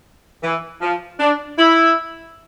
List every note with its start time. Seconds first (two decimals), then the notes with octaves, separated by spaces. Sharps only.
0.43 E3
0.81 F3
1.19 D4
1.59 E4